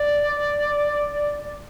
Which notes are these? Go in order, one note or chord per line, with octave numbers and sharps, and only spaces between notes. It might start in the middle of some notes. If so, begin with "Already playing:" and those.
Already playing: D5